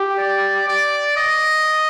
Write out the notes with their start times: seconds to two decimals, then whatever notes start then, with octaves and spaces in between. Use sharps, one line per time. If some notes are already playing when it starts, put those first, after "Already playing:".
Already playing: G4
0.19 D5
0.68 D5
1.17 D#5